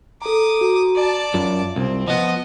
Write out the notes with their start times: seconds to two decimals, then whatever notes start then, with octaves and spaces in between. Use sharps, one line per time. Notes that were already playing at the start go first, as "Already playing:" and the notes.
0.22 A4 A#5 D6 D#6
0.61 F#4 A#5
0.95 D5 A5
1.34 F#2 F4
1.76 C2 C4
2.08 F3 B3 D#5